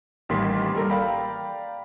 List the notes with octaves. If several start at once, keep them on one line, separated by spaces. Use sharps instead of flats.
A1 D#3 G3 A#3 C6 B6
G3 A4 A#4 A#5
D5 F5 G5 A#5 B5